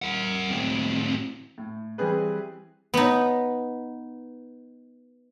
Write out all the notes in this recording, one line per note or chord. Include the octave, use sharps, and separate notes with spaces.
A#4 F#5
A2 C4
A2
E3 G3 C4 G#4 B4
B3 D#4